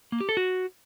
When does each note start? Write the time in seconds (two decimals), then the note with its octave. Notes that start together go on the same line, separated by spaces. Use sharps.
0.12 A#3
0.21 G4
0.29 A4
0.37 F#4